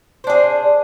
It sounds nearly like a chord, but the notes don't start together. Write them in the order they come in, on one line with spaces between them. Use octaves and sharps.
C5 D4 G#4